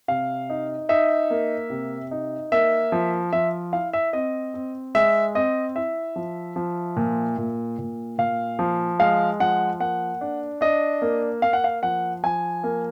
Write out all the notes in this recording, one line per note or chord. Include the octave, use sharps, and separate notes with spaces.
C3 F5
D#4
D#4 E5
A#3
C3
D#4
A#3 E5
F3
F3 E5
E4 F5
E5
C4 D#5
C4
G#3 E5
C4 D#5
E4 E5
F3
F3
A#2
A#2
A#2
A#2 F5
F3
G#3 F5
F3 F#5
A#3 F#5
D4
D4 D#5
A#3
A#3 F5
F#5
F5
F3 F#5
F3 G#5
A#3